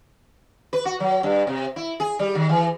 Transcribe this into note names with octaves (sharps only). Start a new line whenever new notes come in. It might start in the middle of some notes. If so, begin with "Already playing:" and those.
B4
F#4
F#3
G2
C3
E4
G#4
G3
D#3
E3